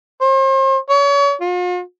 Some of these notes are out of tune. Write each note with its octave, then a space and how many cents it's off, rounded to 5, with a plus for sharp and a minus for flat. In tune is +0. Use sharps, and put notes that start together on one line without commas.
C5 +40
C#5 +35
F4 +45